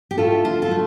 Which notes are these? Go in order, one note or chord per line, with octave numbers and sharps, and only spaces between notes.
G4
A3 E4 F4 A4
D3 F4
F4 A4
A3